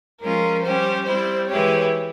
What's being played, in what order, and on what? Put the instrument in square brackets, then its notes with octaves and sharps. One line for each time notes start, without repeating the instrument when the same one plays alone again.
[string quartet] F3 G#3 C#4 F4 [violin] A#4
[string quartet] G3 C#4 G4 [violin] C5
[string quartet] G3 C4 E4 [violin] C5
[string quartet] E3 G#3 E4 G4 [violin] C#5